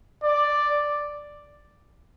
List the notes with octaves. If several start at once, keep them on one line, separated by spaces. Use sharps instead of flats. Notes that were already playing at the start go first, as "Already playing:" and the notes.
D5